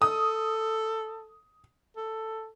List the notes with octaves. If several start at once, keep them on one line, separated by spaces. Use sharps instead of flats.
A4 D#6
A4